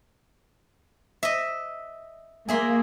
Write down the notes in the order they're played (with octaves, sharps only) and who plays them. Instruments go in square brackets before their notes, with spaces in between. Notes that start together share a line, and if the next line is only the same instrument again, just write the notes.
[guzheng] D#5 E5
[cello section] A#3 [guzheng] G#4 E5 C6